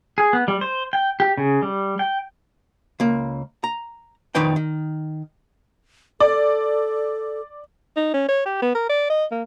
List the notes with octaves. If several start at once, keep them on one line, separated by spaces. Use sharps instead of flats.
G#4
B3
G3
C5
G5
G4
C#3
G3
G5
C#2 A#3
A#5
F2 D#3 D#4 B4 D5 G5
D#3
A4 D5
D#4
C#4
C#5
G4
B3
A#4
D5
D#5
A#3